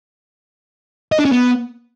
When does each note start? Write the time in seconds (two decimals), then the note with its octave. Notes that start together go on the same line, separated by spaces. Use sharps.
1.12 D#5
1.19 D4
1.25 C#4
1.32 B3